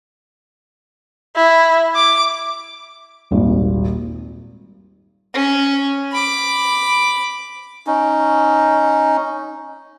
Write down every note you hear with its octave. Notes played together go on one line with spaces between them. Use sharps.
E4
D6
D#1 G#1 A#2
C#4
B5 D6
C#4 D#4